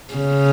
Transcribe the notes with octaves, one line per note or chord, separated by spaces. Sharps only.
C#3